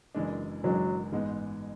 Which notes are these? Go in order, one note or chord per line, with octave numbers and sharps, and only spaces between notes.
F#1 F#2 E3 G#3 D4
F#1 F#2 E3 F#3 G#3 D4
A1 G#2 G#3 B3